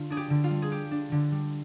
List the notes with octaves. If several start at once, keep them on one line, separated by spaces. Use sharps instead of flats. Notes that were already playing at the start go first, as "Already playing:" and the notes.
Already playing: D3 F4
D4 G#4
G4
D3
F4
G3
G#4
F4 G4
D4
D3
G3